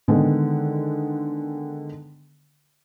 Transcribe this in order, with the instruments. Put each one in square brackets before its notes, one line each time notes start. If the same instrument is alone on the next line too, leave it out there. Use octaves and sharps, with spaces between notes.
[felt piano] D3 D#3 G#3 B3